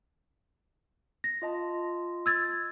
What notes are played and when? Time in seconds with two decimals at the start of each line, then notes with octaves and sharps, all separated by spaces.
1.24 A#6
1.42 F4 D#5 A5
2.26 E6 G#6 A6